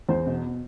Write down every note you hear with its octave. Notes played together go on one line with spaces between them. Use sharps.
E2 C5
B2